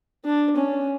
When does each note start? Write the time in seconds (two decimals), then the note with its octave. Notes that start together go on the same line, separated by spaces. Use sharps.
0.25 D4
0.56 C#4